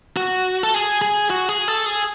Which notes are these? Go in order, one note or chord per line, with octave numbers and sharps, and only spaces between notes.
F#4
A4
G#4
G#4
F#4
G#4
A4
G#4